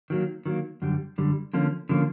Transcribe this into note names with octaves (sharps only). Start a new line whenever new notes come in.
D#3 F#3 A#3
D#3 F#3 A#3
F#2 D3 G3
F#2 D3 G3
D3 F3 A#3 C#4
D3 F3 A#3 C#4